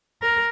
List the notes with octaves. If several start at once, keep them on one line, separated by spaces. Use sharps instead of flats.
A#4